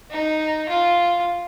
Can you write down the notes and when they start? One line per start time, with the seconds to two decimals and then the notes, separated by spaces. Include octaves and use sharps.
0.11 D#4
0.68 F4